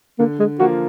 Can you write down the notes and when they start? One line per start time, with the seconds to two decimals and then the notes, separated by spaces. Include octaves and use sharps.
0.19 D3 A#3
0.39 G#3
0.60 F3 A#3 F4 F#4